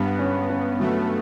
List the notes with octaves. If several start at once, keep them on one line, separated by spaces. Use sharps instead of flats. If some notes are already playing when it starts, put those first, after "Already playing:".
Already playing: G2 B3
C#4
C#4
F#3 A3